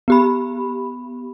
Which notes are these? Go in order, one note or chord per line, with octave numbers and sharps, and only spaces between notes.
B3 G4 B5